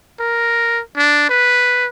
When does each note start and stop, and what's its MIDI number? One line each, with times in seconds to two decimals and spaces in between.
0.20 0.81 70
0.97 1.28 62
1.29 1.87 71